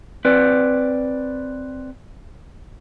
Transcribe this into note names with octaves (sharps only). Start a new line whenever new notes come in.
C4 B4 D5